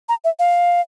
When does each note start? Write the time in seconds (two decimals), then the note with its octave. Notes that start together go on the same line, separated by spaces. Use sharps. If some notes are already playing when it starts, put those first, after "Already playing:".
0.09 A#5
0.24 E5
0.39 F5